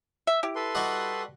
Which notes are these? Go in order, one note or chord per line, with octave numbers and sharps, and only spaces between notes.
E5
E4 G4
A4 B4 C6
G3 F#4 D#5